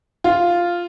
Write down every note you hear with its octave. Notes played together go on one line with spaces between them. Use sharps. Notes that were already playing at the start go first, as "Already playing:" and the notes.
F4